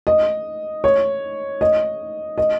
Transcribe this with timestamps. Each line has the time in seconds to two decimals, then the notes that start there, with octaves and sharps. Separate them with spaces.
0.07 D#5
0.84 C#5
1.61 D#5
2.38 D#5